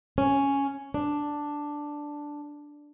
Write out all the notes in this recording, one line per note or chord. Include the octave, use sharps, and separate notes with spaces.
C#4
D4